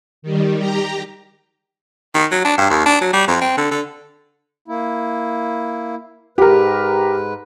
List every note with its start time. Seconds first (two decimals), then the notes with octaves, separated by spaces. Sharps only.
0.22 D#3 G3
0.58 G4 A#5
2.14 D#3
2.32 F#3
2.45 D4
2.58 G2
2.70 D#2
2.86 D4
3.01 F#3
3.13 G3
3.28 F2
3.41 C4
3.57 D3
3.71 D3
4.68 A#3 E4
6.38 G#2 G4 A#4 B4